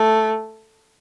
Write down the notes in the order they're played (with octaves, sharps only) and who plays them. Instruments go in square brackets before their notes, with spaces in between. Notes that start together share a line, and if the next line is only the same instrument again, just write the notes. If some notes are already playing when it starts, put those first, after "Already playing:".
Already playing: [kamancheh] A3